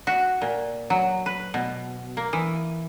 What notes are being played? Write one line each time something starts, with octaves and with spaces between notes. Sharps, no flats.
F#4
A#2
F#3
B4
B2
A#3
E3